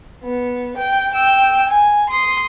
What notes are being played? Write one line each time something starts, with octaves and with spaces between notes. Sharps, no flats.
B3
G5
G5 E6
G#5
C6 D#6